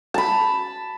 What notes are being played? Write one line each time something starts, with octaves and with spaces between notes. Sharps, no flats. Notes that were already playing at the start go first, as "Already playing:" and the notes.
A5 B5